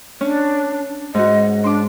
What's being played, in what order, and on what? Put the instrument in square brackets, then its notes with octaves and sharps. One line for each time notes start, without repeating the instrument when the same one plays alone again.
[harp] C#4 [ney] D4
[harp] G#2 F#4 [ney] D#5
[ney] D4 [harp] C6 D6